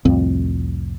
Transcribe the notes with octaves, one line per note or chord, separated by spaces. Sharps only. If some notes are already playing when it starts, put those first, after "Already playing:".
C2 F2 A2 C4